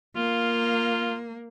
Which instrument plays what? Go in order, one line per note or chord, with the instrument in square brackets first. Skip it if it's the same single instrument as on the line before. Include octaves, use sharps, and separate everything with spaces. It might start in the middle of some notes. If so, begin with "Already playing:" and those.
[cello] A#3 [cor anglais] F4